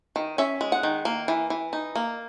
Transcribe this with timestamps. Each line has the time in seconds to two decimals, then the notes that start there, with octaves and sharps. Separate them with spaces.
0.16 D#3
0.38 C#4 E5
0.61 G#3
0.72 F#5
0.83 D#3
1.05 A#3
1.28 E3
1.50 E3
1.73 D#4
1.95 A#3